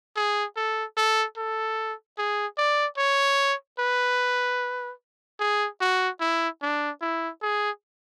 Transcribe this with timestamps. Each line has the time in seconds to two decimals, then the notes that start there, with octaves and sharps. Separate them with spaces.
0.17 G#4
0.56 A4
0.97 A4
1.37 A4
2.18 G#4
2.58 D5
2.98 C#5
3.79 B4
5.40 G#4
5.81 F#4
6.20 E4
6.62 D4
7.01 E4
7.42 G#4